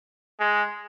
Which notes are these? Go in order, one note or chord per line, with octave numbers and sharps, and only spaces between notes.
G#3